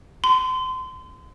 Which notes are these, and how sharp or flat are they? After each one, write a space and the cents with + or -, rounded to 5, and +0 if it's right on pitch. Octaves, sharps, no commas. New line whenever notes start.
C6 -30